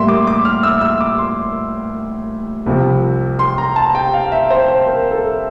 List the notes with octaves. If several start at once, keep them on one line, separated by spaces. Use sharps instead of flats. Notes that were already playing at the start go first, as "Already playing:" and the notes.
Already playing: A2 G3 A#3 E5 C6
D6
D6
F6
E6
E6
D6
C6
C2 C3 F3
C6
A#5
A5
G5
F5
E5
C5
C5
A#4
A4